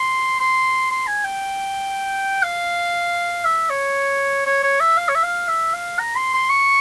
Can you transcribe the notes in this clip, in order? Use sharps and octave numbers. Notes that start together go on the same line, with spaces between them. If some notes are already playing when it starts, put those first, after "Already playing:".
Already playing: C6
C6
C6
G#5
G5
F5
E5
C#5
C#5
C#5
E5
F5
C#5
E5
F5
E5
F5
A#5
C6
C6
C#6